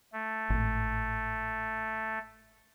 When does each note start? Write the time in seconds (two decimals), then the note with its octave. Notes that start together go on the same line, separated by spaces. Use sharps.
0.13 A3
0.50 G#1 A2